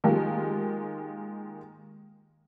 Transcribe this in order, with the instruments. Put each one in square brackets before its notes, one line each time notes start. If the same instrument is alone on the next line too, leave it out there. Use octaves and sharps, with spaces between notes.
[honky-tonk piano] D#3 G#3 A#3 F4 G4